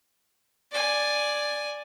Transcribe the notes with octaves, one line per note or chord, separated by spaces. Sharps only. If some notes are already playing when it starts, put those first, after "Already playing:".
D5 G#5